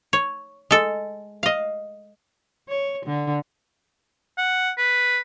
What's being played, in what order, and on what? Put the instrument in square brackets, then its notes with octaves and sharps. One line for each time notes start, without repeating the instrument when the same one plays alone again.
[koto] C#5
G#3 A4
D#5 F5
[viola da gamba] C#5
D3
[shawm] F#5
B4